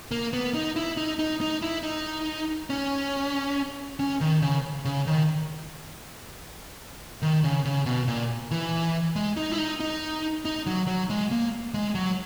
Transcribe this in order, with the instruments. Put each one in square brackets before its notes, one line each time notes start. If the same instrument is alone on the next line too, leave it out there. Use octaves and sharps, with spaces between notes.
[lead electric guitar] A#3
B3
D#4
E4
D#4
D#4
D#4
E4
D#4
C#4
C#4
D#3
C#3
C#3
D#3
D#3
C#3
C#3
B2
A#2
E3
G#3
D#4
E4
D#4
D#4
D#4
F#3
F#3
G#3
A#3
G#3
F#3